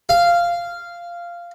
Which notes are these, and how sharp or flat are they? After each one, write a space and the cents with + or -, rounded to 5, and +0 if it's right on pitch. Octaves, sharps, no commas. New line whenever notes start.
F5 -10